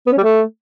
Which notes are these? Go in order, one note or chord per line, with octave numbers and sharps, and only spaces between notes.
B3
C#4
G3
A3